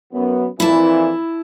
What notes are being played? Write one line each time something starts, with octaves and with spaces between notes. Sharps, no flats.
F#2 B3
F2 A#2 E3 E4 A5